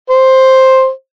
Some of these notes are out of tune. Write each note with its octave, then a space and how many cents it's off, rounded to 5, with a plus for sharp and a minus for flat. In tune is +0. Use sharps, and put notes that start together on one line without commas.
C5 +5